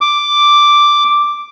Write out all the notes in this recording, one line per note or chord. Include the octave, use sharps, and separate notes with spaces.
D6